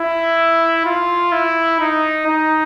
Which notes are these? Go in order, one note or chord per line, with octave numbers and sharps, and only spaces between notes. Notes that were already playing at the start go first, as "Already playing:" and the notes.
Already playing: E4
F4
E4
D#4
D#4